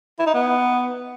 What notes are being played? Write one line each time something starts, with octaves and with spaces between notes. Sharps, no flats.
E4
D#4
B3